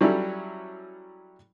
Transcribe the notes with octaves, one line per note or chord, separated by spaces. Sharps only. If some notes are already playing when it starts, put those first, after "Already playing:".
F#3 G3 C#4 E4 A4